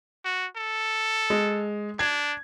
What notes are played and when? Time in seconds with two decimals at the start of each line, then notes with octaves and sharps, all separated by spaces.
0.25 F#4
0.56 A4
1.30 G#3
1.99 D4 G#6